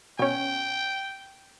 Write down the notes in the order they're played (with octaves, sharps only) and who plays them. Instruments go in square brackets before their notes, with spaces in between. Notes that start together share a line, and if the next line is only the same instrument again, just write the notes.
[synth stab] B2 C#4 [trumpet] G5